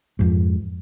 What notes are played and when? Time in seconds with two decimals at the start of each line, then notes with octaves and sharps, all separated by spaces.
0.19 F2 G#2